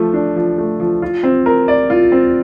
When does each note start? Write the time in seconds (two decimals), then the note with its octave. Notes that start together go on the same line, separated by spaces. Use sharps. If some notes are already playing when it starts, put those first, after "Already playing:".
Already playing: F3 A3
0.13 D4
0.36 F3
0.58 A3
0.80 F3
1.02 F4
1.23 C4
1.46 A#4
1.68 D5
1.90 F4
2.12 C4